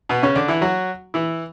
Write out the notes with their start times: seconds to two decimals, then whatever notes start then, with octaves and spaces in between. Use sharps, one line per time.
0.09 B2 B3
0.23 C#3 C#4
0.35 D3 D4
0.48 E3 E4
0.61 F#3 F#4
1.14 E3 E4